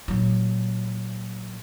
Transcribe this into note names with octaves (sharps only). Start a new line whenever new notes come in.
A#2 F#3